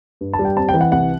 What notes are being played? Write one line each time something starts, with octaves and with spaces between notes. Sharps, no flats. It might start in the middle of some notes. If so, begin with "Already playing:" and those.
G2
A5
G3
G5
C4 A5
G5
E3
F#5
C2 F#5